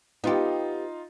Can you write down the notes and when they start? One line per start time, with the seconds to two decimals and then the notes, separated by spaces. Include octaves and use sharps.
0.24 B3 D#4 F4 G4